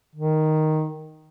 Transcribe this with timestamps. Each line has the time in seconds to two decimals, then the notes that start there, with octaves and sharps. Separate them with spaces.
0.15 D#3